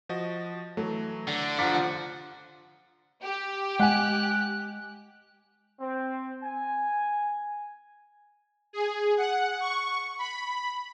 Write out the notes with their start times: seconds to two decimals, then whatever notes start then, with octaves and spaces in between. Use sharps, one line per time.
0.09 F3 F#4 D#5
0.77 E3 F#3 A3
1.28 D3
1.59 F3 F#5 A#5 D6 A6 B6
3.22 G4
3.80 G#3 F#5 G#5 F#6
5.80 C4
6.43 G#5
8.73 G#4
9.17 F#5
9.60 C#6
10.19 B5